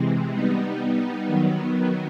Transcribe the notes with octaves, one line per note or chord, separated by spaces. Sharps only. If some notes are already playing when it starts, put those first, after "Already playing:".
Already playing: C3 E3 G#3 C4
G3 B3 D#4
D#3 F#3 B3